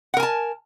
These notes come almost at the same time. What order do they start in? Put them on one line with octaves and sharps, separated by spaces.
F#5 A#4 G#5 A5